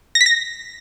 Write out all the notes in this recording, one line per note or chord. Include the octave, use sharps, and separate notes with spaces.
A#6
B6
A#6